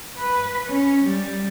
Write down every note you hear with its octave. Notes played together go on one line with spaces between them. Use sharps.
B4
C#4
G3